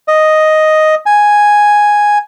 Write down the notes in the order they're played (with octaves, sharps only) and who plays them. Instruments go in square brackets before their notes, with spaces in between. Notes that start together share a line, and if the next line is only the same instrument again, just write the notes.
[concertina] D#5
G#5